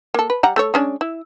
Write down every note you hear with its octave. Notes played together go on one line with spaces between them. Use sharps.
A#3 A4
B4
G3 F#5 A#5
A3 A4 C#5
G#3 C#4 D4
E4